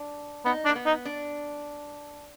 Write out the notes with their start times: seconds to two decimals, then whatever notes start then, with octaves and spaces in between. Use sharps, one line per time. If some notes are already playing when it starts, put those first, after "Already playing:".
Already playing: D4
0.45 B3 D#4
0.65 D4
0.69 A#3
0.75 B3
0.86 D#4
1.05 D4